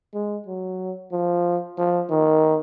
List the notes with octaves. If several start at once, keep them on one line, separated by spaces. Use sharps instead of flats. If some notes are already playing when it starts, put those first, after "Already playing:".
G#3
F#3
F3
F3
D#3